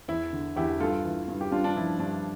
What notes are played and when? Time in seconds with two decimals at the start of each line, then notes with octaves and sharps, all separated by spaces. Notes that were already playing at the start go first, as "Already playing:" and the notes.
0.08 E2 E4
0.33 D3
0.56 E2 E4 G4
0.80 G2 F4 A4
1.04 E3
1.28 G2
1.41 G4
1.51 G2 D4 F4
1.64 D4
1.76 F3 E4
1.99 G2 D4